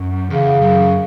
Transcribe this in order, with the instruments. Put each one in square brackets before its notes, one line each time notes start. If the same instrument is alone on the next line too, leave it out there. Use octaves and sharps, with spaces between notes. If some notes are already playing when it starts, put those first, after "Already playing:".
Already playing: [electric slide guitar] F#2
[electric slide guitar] E2 [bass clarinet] C#3
[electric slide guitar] F#2